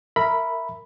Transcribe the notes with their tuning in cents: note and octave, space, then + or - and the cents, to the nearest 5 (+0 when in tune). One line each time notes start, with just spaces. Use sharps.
A#4 -15 E5 +0 B5 +0